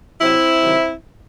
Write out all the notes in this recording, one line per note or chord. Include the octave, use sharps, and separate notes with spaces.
C3 F#3 C4 E4
C3 D#3 F#3